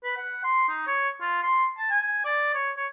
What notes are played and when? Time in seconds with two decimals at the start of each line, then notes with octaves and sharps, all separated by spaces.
0.04 B4
0.17 F#5
0.44 C6
0.69 D#4
0.87 C#5
1.21 F4
1.43 C6
1.77 A5
1.90 G#5
2.25 D5
2.55 C#5
2.77 C#5